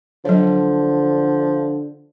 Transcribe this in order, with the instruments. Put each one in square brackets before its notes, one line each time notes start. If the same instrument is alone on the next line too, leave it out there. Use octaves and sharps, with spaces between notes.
[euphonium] D3 [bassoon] F3 [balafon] F#3 C#5